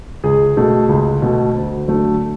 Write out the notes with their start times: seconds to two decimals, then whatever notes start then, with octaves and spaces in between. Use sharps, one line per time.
0.24 C#2 G#4
0.57 B2 A3
0.89 C#2
1.22 B2 A3
1.54 D2
1.87 D3 F#3 A3